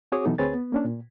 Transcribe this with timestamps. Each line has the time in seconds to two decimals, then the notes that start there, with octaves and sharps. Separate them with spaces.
0.12 C4 F#4 G#4 C#5 D6 D#6
0.25 B2 E3 F#3 B3 D#4 A4
0.38 D2 C4 G#4 B4 C#5 A6
0.54 B3
0.72 A#3 C#4 D4
0.85 A#2